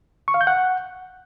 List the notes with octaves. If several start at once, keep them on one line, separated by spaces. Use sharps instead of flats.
C#6
F5
G6
F#5